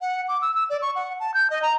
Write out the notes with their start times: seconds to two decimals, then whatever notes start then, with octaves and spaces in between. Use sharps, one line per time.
0.01 F#5
0.28 D6
0.42 E6
0.55 E6
0.70 D5
0.82 C#6
0.95 F#5
1.20 A5
1.34 G6
1.50 D#5
1.62 A#5